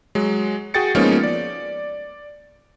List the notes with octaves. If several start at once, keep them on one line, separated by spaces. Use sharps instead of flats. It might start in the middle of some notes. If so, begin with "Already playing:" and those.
F#3 G#3
F#4 G#4 G5 A6 C#7
F3 G#3 A#3 B3 C#4 D#4
D5